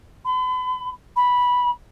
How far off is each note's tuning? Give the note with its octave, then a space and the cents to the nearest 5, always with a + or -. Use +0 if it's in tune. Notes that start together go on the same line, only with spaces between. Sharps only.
B5 +45
B5 -5